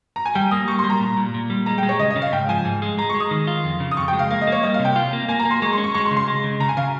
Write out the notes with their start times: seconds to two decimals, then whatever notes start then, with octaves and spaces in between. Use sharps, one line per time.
0.16 A#5
0.25 G#5
0.35 G3 G5
0.51 A#3 D#6
0.68 G3 C#6
0.79 C6
0.84 G3
0.90 A#5
1.00 A#2
1.17 A#2
1.34 A#2
1.50 G3
1.66 G#3 A#5
1.78 G5
1.83 G#3
1.89 C#5
1.99 C#3 D#5
2.11 D#5
2.16 C#3
2.22 F5
2.32 G#2 G5
2.49 F3 G#5
2.65 G#2
2.82 G#3
2.98 G#3 A#5
3.10 C#6
3.14 G#3
3.20 D#6
3.31 D#3
3.47 F4
3.64 F2
3.80 C#3
3.91 D#6
3.97 F2 C#6
4.08 G5
4.13 G#3
4.19 F5
4.30 A#3 F5
4.41 D#5
4.47 A#3
4.52 C#5
4.63 G3 D#5
4.74 F5
4.79 C3
4.85 G5
4.96 F4
5.13 A#3
5.28 A#3 G#5
5.40 A#5
5.45 A#3
5.51 C6
5.62 G#3 C#6
5.73 C6
5.78 C#4
5.84 C#6
5.94 G#3 C#6
6.06 C6
6.11 C#3
6.17 C6
6.28 G#3
6.44 C#3
6.60 C#3 A#5
6.69 G#5
6.77 C#3 F5